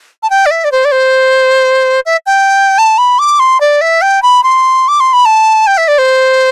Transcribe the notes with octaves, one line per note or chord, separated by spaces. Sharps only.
A5
G5
D5
E5
D5
C5
D5
C5
E5
G5
A5
B5
D6
C6
D5
E5
G5
B5
C6
D6
C6
B5
A5
G5
E5
D5
C5